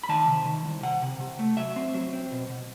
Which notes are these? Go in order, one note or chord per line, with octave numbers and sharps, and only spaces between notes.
B5
D#3 A5
C3
D#3
C2
C3 F#5
C3
C3
A3
F#3 E5
C4
F#3
C4
B2
B2